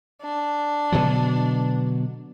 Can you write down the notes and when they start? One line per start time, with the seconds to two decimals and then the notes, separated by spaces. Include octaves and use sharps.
0.22 D4
0.92 B2 D3 F#3